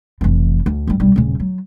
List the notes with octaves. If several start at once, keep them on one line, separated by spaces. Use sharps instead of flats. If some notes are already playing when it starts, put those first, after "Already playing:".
F1 E3
D2
G1 G3
B1 G3
D#1 C#3
F#3